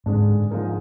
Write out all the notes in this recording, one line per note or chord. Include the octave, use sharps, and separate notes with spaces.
G#2 D3 G#3 D4
G#2 F3 G#3 D#4 A#4